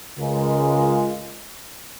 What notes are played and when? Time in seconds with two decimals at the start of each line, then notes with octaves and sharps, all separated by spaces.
0.18 C#2 C#3 G#3 F4 A#4